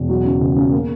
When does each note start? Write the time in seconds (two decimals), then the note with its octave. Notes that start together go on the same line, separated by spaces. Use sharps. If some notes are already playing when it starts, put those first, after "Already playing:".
Already playing: E1
0.09 F#3
0.24 C#3
0.40 C#2
0.56 C#3
0.72 A#3